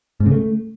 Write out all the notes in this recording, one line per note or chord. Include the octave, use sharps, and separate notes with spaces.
G#2
C#3
A3